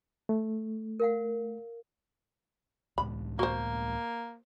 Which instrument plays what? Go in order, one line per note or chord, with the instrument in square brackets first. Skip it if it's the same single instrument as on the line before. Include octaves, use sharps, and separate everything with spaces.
[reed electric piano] A3
[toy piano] A#4 F5 F#5
[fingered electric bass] C#2 A2 G#3 [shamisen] B5
[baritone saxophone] A#3 [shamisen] F#4 C5